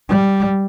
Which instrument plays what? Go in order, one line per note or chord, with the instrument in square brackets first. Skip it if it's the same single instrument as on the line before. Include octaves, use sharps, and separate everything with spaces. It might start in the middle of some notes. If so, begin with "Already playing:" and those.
[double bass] G3